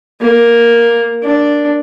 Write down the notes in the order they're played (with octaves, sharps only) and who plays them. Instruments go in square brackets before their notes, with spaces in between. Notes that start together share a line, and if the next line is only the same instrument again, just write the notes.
[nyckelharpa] A#3
D4